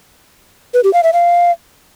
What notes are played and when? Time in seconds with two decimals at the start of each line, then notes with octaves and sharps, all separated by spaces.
0.74 B4
0.84 G4
0.94 F5
1.03 E5
1.13 F5